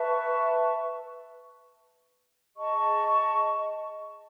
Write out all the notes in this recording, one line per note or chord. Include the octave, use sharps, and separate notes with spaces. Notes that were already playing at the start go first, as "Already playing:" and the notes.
Already playing: B4 E5 A5 C#6
G#4 D#5 A5 C#6